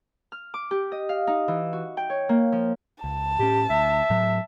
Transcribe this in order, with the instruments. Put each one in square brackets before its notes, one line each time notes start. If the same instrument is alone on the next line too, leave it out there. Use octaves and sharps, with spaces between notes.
[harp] F6
D6
G4
D#5
F5
D#4
E3
F#4
G5
C#5
A#3
F3
[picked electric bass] C#2 [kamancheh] A5
[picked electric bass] A2 C#4 [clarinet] G4
[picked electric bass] D2 [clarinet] E5
[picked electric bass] A2 F#3